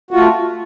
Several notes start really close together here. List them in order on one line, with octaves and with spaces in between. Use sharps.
F#4 F4 A3